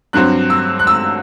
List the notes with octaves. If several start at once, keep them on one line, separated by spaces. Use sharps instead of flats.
G2 F#3 C4 F#6
E6
F#6
E6